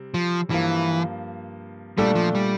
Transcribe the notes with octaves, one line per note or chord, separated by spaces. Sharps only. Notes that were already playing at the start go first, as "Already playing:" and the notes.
Already playing: C3 G3 C4
F3
G2 E3 F3 A#3
A#2 G3 A3 D4 A4
F3
G3